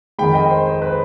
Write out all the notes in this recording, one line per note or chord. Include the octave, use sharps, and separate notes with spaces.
F2 D#3 G#3 G5 B5
D#5 G5
C5
C5
B4